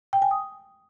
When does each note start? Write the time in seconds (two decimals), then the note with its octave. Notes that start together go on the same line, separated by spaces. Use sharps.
0.13 G5
0.22 G#5
0.31 D#6